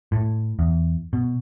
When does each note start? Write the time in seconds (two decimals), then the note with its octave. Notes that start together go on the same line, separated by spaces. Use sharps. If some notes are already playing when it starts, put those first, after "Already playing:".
0.12 A2
0.59 E2
1.13 B2